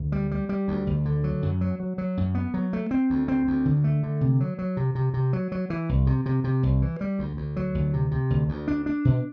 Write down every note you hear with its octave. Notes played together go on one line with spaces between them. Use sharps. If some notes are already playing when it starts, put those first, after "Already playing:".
Already playing: D2
G3
G3
G3
D2
D2
D3
F#3
F#2
F#3
F#3
F#3
F#2
B3
F#3
A3
C4
D2
C4
D2
D3
A3
D3
C3
F#3
F#3
C3
C3
C3
F#3
F#3
E3
C2
C3
C3
C3
C2
E3
G3
D2
D2
F#3
D2
C3
C3
D2
D2
D4
D4
B2